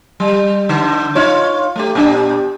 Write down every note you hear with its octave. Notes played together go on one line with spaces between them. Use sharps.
G3
D3
D#4 F4 C#5
A3 G4
A#2 D4 G4